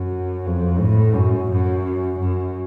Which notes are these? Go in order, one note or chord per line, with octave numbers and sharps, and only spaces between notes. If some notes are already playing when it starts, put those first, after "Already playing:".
Already playing: F#2
F2
A2
F#2
F#2
F#2